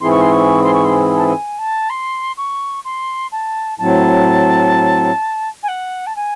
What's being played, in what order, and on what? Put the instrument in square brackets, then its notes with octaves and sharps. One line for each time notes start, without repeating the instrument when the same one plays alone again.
[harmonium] G#2 E3 C4 E4 G#4 [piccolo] C6
[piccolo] C#6
C6
C#6
C6
C#6
C6
A5
G#5
A5
C6
C#6
C6
A5
[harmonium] A2 F#3 C4 [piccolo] A5
[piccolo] G#5
F#5
A5
G#5